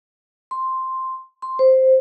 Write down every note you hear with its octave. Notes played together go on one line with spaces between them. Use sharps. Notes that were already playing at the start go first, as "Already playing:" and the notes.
C6
C6
C5